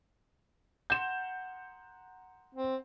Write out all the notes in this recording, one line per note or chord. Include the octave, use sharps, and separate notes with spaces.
F#5 A#5 C6 G6 E7
C4